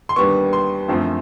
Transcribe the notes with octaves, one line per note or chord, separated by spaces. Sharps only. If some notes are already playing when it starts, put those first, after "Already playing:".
C6
D#2 D3 G3 B3 C#6
C6
F#2 D3 F3 A3 C4